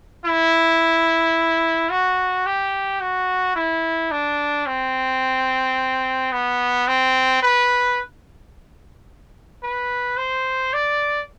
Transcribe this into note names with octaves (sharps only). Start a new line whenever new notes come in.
E4
F#4
G4
F#4
E4
D4
C4
B3
C4
B4
B4
C5
D5